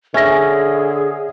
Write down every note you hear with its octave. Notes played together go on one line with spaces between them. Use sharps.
D3 C#4 G#4 E5 A#6